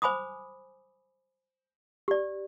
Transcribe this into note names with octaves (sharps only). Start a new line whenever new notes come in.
C5 G#5 B5 D6 D#6
G4 D5